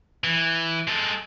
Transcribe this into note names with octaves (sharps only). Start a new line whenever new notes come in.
E3
G#3 A4